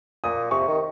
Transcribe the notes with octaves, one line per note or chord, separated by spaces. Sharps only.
A#2 D#6
C3 C#6
D#3